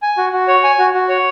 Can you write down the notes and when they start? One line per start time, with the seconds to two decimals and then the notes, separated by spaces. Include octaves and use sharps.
0.02 G#5
0.18 F#4
0.33 F#4
0.48 C#5
0.63 G#5
0.78 F#4
0.94 F#4
1.09 C#5